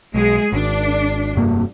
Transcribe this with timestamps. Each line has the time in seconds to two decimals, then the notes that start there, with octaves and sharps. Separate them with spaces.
0.14 B1 G#3 G#4
0.53 G#1 D4
1.35 F1 G2 A#3